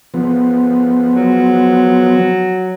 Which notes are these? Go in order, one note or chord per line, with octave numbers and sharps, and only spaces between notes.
F3 B3
F#3